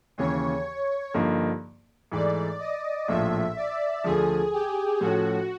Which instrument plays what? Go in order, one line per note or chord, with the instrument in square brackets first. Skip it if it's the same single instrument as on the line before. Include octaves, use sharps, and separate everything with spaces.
[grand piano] D#2 C#3 E3 [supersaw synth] C#5
[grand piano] G2 D3 F3 A#3 D#4
[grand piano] G#2 E3 A3 [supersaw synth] D5
[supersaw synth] D#5
[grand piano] A#1 A2 F3 [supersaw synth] E5
[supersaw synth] D5
[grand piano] D2 D3 F3 [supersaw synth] G#4
[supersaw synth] G4
[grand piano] A2 F3 A3 C#4 [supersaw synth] F#4